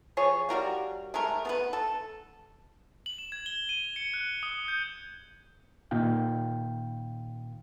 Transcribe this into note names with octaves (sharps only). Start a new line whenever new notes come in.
F3 G#4 C#5
G3 F#4 A#4 F5
G#3 A3 A#4
B3 A#4 B4
A4
F#7
E7
G#6
G7
D#7
C#7
F#6
D#6
G6
A#2 D#3 F5 G5